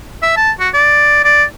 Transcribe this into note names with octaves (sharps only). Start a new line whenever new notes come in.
E5
A5
F#4
D5
D5